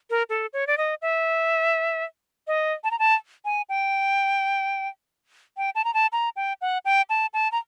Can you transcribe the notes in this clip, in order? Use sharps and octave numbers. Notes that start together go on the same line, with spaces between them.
A#4
A4
C#5
D5
D#5
E5
D#5
A5
A#5
A5
G#5
G5
G5
A5
A#5
A5
A#5
G5
F#5
G5
A5
A5
A#5